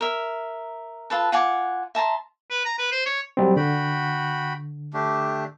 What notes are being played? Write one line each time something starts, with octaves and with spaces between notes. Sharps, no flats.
A#4 E5
F4 A4 B4 A5
F4 F#5 G#5 D6
E5 A5 A#5 C6
B4
A#5
B4
C5
C#5
F#3 G3 C4
D3 F#4 G5 B5
A3 D4 G4